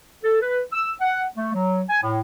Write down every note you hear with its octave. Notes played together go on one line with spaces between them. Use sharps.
A4
B4
E6
F#5
A3
F#3
G#5
A2